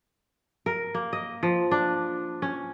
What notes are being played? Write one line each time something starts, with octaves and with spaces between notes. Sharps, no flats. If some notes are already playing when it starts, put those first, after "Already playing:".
A#4
A#3
D#5
F3
D4
C#4